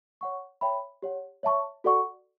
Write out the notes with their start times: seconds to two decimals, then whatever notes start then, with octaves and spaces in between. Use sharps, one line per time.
0.21 C#5 F#5 C#6
0.61 C#5 E5 G5 B5
1.02 G4 C#5 F#5
1.43 C#5 E5 A5 C#6
1.84 F#4 A4 D5 F#5 C#6